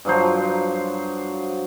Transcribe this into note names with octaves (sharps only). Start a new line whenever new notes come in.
G2 F3 F#3 C5